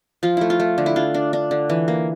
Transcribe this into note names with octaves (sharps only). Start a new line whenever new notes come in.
F3 F4
A3 E4
F4
A3
D3
E4
D4 F4
D4
D4
D3
E3
A#3